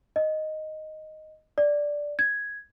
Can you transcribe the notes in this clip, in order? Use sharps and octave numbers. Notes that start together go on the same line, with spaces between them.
D#5
D5
G#6